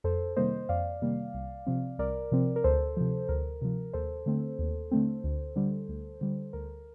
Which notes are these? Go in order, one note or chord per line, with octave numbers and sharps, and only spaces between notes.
F2 A4 C5
C3 D#3 G3 A#3 C5 D#5
F2 D5 F5
C3 D#3 G3 A#3
C2
C3 F3 C4
C2 A#4 D5
C3 F3 C4
A#4
D2 A4 C5
C3 F3
D2 A#4
C3 F3
D#2 A4 C5
D3 A3 C4
D#2
D3 A3 C4
D2
D3 G3
D2
D3 G3
D2 A#4